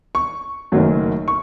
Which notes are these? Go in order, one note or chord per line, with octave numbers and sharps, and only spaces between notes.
C#6
F#1 F#2 D#3 F#3 A3
C#6